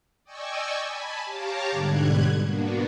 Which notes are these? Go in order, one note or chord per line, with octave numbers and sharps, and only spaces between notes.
D5 D#5 G5 G#5 C#6 E6
G#5 A5 B5
G4 C#5 F5 A5 A#5 D6
G#2 B2 D3 G3 F#6 G#6
A#3 B3 D4 F#4